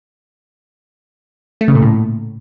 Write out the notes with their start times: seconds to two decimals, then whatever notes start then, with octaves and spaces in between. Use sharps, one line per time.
1.61 A3
1.68 C#3
1.75 A#2
1.82 A2